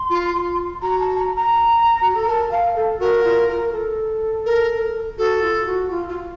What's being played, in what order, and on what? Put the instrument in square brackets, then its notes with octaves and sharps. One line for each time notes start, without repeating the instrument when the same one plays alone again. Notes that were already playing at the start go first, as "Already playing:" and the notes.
Already playing: [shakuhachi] C6
[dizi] F4
[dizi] F#4 [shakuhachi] A#5
[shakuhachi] A5
A#5
A#5
[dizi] F#4
A4
[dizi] A#4 [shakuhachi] A5
[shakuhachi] F5
A4
[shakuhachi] F#4 [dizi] A#4
[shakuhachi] F4
A#4
A4
[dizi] A#4
[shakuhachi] F#4 [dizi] A4
[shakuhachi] F4
F#4
F4
F4